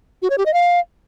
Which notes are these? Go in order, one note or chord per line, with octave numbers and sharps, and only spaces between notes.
F#4
C#5
G4
D#5
F5